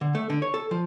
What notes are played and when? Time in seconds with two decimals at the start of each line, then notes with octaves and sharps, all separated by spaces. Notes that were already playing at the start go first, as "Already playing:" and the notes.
0.01 D3
0.15 A3
0.30 D3
0.42 C#5
0.54 A4
0.71 F3